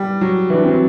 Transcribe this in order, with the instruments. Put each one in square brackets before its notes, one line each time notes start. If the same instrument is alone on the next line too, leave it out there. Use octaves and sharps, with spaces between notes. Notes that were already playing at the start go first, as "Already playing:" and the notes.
Already playing: [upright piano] G3
F#3
[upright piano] E3 [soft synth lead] D4
[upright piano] F#3 [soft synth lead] C4